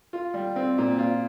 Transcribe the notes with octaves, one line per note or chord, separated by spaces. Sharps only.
F4
G3
C4
A#2
F4